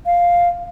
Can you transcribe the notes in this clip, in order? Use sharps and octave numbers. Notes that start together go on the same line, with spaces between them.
F5